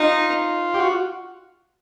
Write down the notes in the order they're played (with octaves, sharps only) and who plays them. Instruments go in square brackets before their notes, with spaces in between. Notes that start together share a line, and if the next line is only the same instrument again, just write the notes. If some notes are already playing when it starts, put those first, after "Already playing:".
Already playing: [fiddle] D#4 [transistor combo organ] F4
[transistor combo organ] G4
F#4